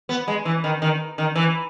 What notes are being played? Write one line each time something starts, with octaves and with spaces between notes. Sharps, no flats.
B3
G#3
E3
D#3
D#3
D#3
E3